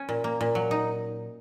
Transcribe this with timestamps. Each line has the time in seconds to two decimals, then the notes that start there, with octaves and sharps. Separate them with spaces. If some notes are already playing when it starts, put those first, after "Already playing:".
Already playing: C#4
0.09 A#2
0.24 A#3
0.41 A#2
0.55 F#3
0.71 D#4